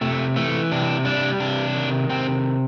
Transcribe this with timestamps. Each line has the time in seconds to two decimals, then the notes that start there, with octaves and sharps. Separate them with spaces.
0.01 C3 A3
0.36 E3 A3
0.71 C3 D4
1.05 G3 D4
1.40 C3 D4
1.75 D#3
2.10 C3 C4